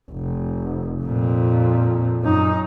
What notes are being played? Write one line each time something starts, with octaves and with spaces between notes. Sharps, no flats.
F1
F2 A#2
F#2 D#4